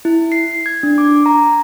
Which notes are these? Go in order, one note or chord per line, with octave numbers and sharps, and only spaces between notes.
E4
C7
G#6
D4
D6
A#5